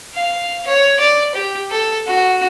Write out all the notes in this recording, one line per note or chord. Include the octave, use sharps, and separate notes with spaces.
F5
C#5
D5
G4
A4
F#4